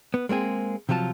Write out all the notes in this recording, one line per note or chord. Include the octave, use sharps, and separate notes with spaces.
B3
G#3 A#3 C4 G#4
C3 F3 F#3 F4 A5